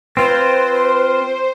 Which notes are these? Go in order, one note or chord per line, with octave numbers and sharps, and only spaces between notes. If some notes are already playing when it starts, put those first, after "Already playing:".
C4 F4 B4 C5